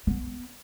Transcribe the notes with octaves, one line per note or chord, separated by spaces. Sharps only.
B3